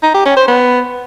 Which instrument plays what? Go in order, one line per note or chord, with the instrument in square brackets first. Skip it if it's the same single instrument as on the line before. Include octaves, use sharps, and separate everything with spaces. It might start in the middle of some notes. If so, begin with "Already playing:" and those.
[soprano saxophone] D#4
G4
C#4
C5
B3